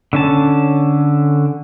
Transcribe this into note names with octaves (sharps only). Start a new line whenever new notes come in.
D3 C#4 A5